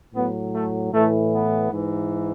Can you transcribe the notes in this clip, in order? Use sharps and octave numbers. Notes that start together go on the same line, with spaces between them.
A2 F#3 B3
A3
A2 E3 A3
B3
G#2 E3